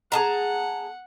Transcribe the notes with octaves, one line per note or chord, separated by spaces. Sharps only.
G#4 F#5 A5 A#5